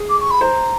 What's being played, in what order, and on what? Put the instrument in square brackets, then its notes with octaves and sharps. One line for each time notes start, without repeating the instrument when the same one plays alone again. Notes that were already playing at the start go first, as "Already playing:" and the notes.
Already playing: [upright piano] G#4
[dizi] D6
C#6
B5
[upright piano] C5 [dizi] A#5